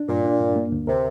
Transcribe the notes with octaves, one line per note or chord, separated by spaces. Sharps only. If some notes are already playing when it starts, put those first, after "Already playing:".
Already playing: D4
G2 A#2
D4
G2
A#3
D2
C3 A#4